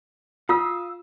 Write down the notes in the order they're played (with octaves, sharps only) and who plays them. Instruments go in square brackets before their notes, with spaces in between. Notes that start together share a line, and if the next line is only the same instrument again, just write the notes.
[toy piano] F4 [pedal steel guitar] F5 D#6 E6